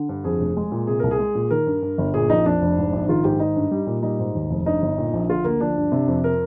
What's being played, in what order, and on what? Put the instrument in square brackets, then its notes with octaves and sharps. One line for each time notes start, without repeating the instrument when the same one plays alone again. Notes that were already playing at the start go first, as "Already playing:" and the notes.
Already playing: [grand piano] D3
G2
[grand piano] F2 [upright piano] G#4
[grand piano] F1
G#3
A#2
[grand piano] C3 [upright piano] G#4
[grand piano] C2 [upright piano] A#4
[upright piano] G#4
[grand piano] G#3
A#2
[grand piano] D#3 [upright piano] A#4
[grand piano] G2
G2
G1
[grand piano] A#2 [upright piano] G#4
[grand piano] A#1 [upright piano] D#4
[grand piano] F2 [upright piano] D4
[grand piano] F1
G#2
A#1
[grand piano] D#3 [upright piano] F4
[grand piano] G#2 [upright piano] G4
[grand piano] D#3 [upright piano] D#4
[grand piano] G2
G3
A#2
[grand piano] G3 [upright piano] D#4
[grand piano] G#2
D#2
F1
[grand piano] G2 [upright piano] D#4
[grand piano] G1
A#2
A#1
[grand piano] D3 [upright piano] F4
[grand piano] D2 [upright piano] A#3
[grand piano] F3 [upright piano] D4
[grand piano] G2
C3
F2
[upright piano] A#4